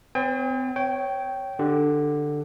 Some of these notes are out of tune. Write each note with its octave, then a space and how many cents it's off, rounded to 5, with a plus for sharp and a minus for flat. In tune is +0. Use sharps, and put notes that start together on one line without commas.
C4 -40 C#5 +0 G5 +40
C#5 +0 G5 -15
D3 +10 G4 +0